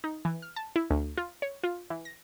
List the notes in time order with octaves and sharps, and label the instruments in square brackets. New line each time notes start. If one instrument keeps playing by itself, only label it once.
[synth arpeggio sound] D#4
E3
F6
A5
E4
D2
F4
C#5
F4
E3
A#6